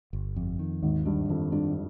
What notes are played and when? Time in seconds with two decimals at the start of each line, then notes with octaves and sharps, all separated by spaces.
0.13 G1
0.36 F2
0.59 D#3
0.82 G#1 D#2 G#2
1.06 G2 D4
1.29 F2 D#3
1.52 G2 D4